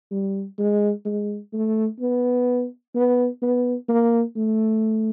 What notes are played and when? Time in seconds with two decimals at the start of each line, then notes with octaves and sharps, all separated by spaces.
0.11 G3
0.58 G#3
1.05 G#3
1.53 A3
2.00 B3
2.95 B3
3.42 B3
3.89 A#3
4.36 A3